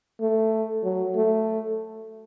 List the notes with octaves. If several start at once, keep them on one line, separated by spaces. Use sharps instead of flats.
A3
F#3
A3